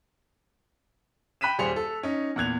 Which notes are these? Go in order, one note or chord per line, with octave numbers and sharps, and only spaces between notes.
G5 B5 F#6 B6 D#7 E7
D#1 G3 G#4 C5 C#7 F7
A4
C#4 D#4
E2 A#2 F#6 G#6 F7